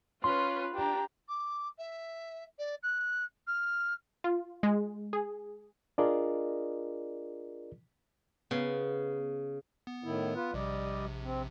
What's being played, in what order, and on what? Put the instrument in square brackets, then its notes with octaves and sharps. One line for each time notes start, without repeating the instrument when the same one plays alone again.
[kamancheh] C#4 [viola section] F4 B4 [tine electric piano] C6
[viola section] D4 [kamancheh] G4 A#5
[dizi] D6
E5
D5
F#6
F6
[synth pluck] F4
G#3
G#4
[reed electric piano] D4 F4 G#4 A#4 D5 D#5
[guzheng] C#3 [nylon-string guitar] B3
[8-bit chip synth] B3
[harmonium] A2 D#3 E4
F4 B4
[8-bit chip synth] A#1 C3 [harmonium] G3 D5 D#5
[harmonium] C4